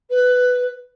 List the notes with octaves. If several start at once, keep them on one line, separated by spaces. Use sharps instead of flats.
B4